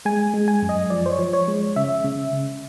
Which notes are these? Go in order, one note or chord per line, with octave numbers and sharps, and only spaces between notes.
G#3 G#5
G#3
G#5
F#2
D#5
F3 D5
C5
C#5
F3
C#5
G#3
C#3 E5
C#3
C#3